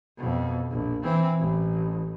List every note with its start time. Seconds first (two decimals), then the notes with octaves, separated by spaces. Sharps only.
0.18 F2 B2
0.71 A#1
1.03 E3 C4
1.40 A1